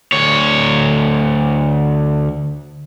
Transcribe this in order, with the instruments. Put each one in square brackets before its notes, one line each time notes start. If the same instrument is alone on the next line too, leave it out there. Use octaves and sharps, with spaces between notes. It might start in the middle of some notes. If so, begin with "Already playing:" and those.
[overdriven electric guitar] D2 C#5